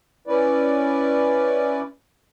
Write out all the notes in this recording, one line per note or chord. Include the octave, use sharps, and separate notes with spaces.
C#4 E4 B4 D5